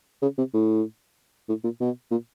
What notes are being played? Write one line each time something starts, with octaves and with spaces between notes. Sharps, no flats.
C#3
C3
A2
A2
A#2
B2
A#2